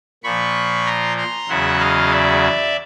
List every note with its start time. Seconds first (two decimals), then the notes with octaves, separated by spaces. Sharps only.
0.24 A#2 F3 B5 C#6
0.86 A#5 C6
1.17 A#5 C6
1.49 E2 C#3 F#3 E5 F#5
1.80 D#5 F5
2.11 D5 E5